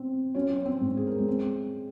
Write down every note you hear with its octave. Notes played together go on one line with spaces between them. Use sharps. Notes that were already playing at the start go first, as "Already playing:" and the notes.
Already playing: C4
F#3 C#4 C#5
C#5
C4 C5
G#2
G#4
A#4
G#3 G#4
C4